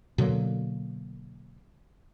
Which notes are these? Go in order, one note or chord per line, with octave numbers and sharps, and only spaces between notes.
B2 D3 F#3 A#3